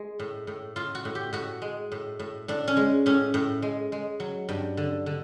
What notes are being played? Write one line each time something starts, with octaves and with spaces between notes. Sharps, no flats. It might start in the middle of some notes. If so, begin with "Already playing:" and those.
Already playing: G#3
A2
A2
A2 F4
F#4
A2
G4
A2 F#4
G#3
A2
A2
A2 D4
C#4
G#3
A2 C#4
A2
G#3
G#3
F#3
G2
D3
D3